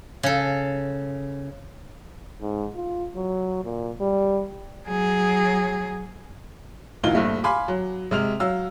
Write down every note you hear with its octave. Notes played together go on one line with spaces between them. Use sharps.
C#3 A4
G#2
F4
F#3
A#2
G3
F#3 G#4
D2 A#2 E3 D#4 F5 G7
A#1 G2 A3
F5 G#5 B5 C6 D6
F#3
C3 G#3 F6 F7
F#3 F5 E6